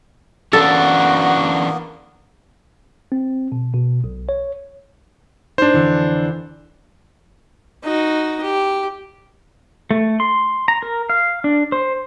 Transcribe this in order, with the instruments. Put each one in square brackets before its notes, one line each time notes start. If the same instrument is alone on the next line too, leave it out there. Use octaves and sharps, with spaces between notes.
[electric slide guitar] E3 C#4 D4 [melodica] A#3 B3 [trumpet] F#4 [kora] A4
[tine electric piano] C4
B2
B2
B1
C#5
[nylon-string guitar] G#2 D#4 [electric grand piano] D4 C5
[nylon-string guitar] F2 D3 E3
[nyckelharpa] D#4 F#4
G4
[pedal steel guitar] A3
C6
A#5
A#4
F5
D4
C5